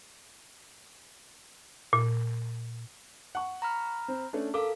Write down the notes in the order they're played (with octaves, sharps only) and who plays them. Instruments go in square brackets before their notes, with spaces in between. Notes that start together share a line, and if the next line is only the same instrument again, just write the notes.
[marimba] A#2
[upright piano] F#5 C#6
[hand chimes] A#5 B5 F6
[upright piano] C4
A3 C#4 D4
[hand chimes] A4 A#4 F5 [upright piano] D6